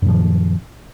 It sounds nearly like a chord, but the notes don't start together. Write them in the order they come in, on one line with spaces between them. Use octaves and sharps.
F#2 A#2 F3 D#3